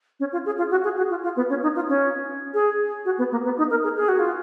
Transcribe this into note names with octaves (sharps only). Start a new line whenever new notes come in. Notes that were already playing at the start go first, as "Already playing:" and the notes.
C#4
F4
G#4
F4
F#4
G#4
F#4
F4
F4
B3
C#4
D#4
F4
C#4
G#4
F#4
B3
A#3
B3
D#4
A#4
G#4
G#4
F#4
F4